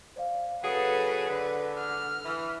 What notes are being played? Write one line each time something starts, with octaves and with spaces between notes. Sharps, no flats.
C5 D5 F5
C#3 F#3 G#4 A4 B4 F#5 D#6
D3 B4
F6
E3